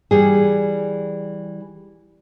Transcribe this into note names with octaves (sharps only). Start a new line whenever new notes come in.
E3 G3 G#4